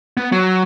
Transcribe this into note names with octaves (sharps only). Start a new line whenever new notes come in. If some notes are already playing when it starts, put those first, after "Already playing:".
B3
F#3